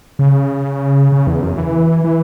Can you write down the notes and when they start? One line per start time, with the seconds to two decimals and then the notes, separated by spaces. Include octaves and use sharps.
0.19 C#3
1.12 C#3
1.27 E2
1.42 F#2
1.57 E3
2.04 E3